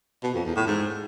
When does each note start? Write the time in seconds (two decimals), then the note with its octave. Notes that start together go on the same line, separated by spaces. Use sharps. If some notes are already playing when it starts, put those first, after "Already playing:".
0.23 B2
0.34 F2
0.45 E2
0.56 A2
0.67 G#2